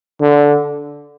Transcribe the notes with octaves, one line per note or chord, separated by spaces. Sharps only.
D3